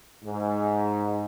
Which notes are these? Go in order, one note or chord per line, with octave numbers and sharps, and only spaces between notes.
G#2